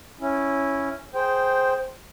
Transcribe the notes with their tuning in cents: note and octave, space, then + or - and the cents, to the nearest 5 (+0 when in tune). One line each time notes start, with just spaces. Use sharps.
C#4 +0 E4 +0
G#4 +0 C5 +0 G5 -10